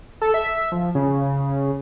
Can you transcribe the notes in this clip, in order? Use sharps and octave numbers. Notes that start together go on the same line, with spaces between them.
A4
E5
F3
C#3